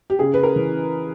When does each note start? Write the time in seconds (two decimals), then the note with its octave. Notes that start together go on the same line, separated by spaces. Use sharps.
0.10 G4
0.19 C#3 G#4
0.34 B4
0.43 A#4
0.56 E3